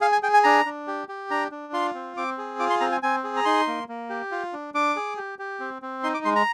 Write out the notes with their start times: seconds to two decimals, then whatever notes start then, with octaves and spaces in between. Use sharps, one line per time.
0.01 G#4 F5
0.12 G#5
0.23 G#4 G5
0.34 G#5
0.44 D4 A#5
0.66 D4
0.87 G4
1.09 G4
1.30 D4 A#5
1.51 D4
1.73 F4 C6
1.94 C4
2.17 C4 D6
2.38 G#4
2.59 F4 D6
2.70 C6
2.80 C4 A#5
2.92 G#5
3.03 C4 G#5
3.24 G#4
3.37 A#5
3.45 D#4 C6
3.67 A#3
3.89 A#3
4.10 G4
4.31 F4
4.53 D4
4.74 D4 D6
4.96 G#4
5.17 G4
5.39 G4
5.60 C4
5.82 C4
6.03 D#4 C6
6.14 D6
6.25 G#3 C6
6.36 A#5